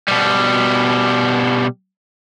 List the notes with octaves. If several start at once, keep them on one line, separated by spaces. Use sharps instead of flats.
B2 G3